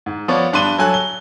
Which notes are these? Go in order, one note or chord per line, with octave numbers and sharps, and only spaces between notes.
G#2
F3 B3 C#5 D5
G2 D4 A5 C6 D#7 G7
F#3 A4 G#5 F#6
G7